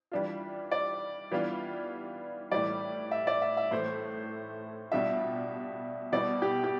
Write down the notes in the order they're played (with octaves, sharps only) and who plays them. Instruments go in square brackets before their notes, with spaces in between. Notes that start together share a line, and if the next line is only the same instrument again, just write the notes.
[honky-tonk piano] E3 G3 D4 F4
[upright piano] D5
[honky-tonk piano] E3 G3 B3 D4 F4
[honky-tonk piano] A2 E3 G3 [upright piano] D5
[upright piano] E5
D5
E5
E5
[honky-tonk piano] A2 E3 A3 [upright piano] C5
[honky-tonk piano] B2 G3 D4 F4 [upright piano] E5
[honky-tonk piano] B2 G3 B3 E4 [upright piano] D5
[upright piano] G4
G4